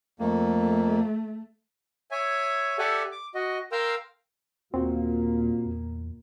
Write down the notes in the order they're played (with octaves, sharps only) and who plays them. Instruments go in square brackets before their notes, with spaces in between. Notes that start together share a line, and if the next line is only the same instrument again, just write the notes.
[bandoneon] F2 A#3 [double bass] A3
[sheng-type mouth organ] C#5 E5 G#5
G4 A4 D5 E5 F#5 G#5
D6
F#4 D#5
A#4 F5 G5 A#5 C6 E6
[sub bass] D#2 [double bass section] A#2 A#3 [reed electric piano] C4 F#4 [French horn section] F4
[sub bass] E2